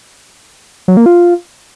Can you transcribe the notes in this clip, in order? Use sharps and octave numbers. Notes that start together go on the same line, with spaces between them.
F#3
A#3
F4